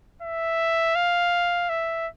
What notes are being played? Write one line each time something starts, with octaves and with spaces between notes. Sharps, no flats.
E5
F5
E5